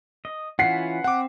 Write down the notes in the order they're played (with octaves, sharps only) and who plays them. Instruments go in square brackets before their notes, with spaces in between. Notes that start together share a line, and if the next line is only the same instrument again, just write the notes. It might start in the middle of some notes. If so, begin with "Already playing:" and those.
[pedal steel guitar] D#5
[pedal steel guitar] E3 C#4 F4 [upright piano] F#5 B6 C7
[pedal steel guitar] C4 [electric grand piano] F#5 D6